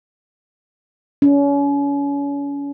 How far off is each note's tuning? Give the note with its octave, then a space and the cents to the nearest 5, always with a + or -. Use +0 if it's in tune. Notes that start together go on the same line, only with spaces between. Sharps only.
C#4 +35